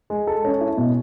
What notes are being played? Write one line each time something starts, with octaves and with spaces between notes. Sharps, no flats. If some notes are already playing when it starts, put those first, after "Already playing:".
G#3
A4
C#4
E4
B2